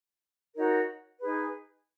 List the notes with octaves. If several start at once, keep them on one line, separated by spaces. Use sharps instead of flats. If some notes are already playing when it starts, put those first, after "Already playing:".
D#4 F#4 A#4 C#5
D#4 G#4 B4